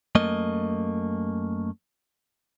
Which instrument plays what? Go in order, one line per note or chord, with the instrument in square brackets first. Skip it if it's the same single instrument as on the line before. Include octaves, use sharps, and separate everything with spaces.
[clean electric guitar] F#2 A3 A#3 D#5